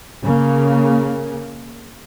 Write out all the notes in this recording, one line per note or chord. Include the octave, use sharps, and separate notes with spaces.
C#3 A#3